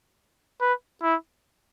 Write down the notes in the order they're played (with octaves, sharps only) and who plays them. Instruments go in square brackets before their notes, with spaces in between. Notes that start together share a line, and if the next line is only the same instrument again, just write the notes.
[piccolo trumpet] B4
E4